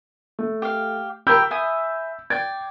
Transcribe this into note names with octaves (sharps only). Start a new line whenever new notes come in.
A3
G4 F5
G4 A#4 G5 B5 E6 G6
E5 G#5 D#6
D5 G5 G#6